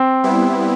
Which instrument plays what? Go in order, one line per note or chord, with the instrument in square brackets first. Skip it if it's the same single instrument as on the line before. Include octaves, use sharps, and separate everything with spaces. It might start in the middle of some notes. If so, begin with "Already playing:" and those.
Already playing: [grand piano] C4
[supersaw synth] G3 B3 E4